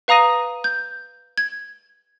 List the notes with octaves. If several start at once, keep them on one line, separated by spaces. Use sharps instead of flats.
B4 F5 A#5 D#6 A#6 D#7
G6
G#6